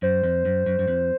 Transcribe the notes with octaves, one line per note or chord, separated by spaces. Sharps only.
F#2 C5
F2
F#2
F#2
F#2
F2